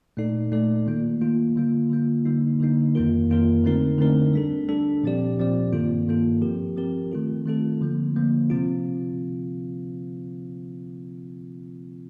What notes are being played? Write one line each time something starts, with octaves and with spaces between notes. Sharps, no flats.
A#2 A3 D#4 A4 D5
A#2 A3 D#4 A4 D5
D#3 A#3 F4
D#3 A#3 F4
D3 G3 A#3 F4
D3 G3 A#3 F4
D3 G3 A#3 D#4
D3 G3 A#3 D#4
F2 D#3 A#3 F4 A#4
F2 D#3 A#3 F4 A#4
D3 A3 C4 D#4 A#4
D3 A3 C4 D#4 A#4
G3 D4 A4
G3 D4 A4
A#2 F3 C4 G4 D5
A#2 F3 C4 G4 D5
G2 D#3 A#3 F4 A4
G2 D#3 A#3 F4 A4
F3 C4 G4 A#4
F3 C4 G4 A#4
D#3 A3 C4 F4 A4
D#3 A3 C4 F4 A4
D3 F3 A#3
D3 F3 A#3
C3 F3 C4 F4